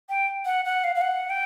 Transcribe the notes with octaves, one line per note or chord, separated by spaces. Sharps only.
G5
F#5
F#5
F5
F5
F#5
G5